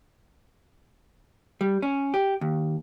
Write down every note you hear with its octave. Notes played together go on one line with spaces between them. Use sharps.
G3
C#4
G4
D#2